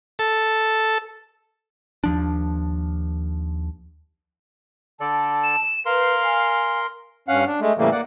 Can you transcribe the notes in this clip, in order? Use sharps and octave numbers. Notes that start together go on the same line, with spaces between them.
A4
D#2 F3 D4
D3 A4 D5 A5
E7
A#4 B4 F5 C6
G#5
G2 C#4 F5 F#5
D4
G#3 A3
A2 C#3 E3 G3 A3 A#3
A#3 D5 F#5